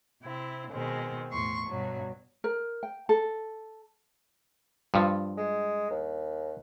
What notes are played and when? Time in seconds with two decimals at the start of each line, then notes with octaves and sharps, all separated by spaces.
0.22 C3 C4 E4
0.72 B2 D#3 G#3 C4
1.31 E2 A2 C6 C#6
1.69 G2 B2 F#3
2.44 A#4
2.83 G5
3.09 A4
4.94 G2 F3
5.37 G#3
5.90 D#2